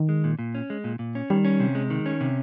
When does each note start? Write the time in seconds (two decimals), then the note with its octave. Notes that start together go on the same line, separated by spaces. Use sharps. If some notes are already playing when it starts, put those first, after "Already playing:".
Already playing: D#3
0.09 G#3
0.24 A#2
0.39 A#2
0.55 C#4
0.70 G#3
0.84 A#2
0.99 A#2
1.15 C#4
1.30 D#3 G3
1.45 C#4
1.60 C3
1.75 G#3
1.90 D#3
2.06 C#4
2.21 C3